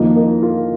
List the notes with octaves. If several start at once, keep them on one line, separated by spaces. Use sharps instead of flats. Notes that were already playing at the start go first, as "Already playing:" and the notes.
Already playing: F2 D#3 A#3 A#4 D#5
A#4 D#5
F4 A#4